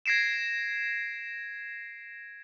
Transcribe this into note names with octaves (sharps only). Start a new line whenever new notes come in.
G#6 A#6 C7 D7 E7